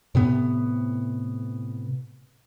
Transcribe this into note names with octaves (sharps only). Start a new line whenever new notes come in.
A2 C3 B3